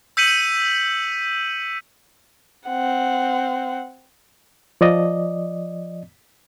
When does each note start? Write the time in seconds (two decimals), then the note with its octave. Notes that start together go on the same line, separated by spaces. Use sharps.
0.17 E6 G6 B6 C#7 D#7 F#7
2.67 C4 F#5
4.81 F3 D5 D#5